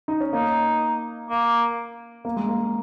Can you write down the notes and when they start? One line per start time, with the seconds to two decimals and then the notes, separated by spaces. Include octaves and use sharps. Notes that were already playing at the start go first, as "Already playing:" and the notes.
0.08 D#4
0.20 C#4
0.33 A#3 D#4
1.29 A#3
2.25 A#3
2.36 G#3
2.49 A#3